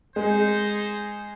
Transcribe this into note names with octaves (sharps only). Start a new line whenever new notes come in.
G#3 D#4 G#4 C5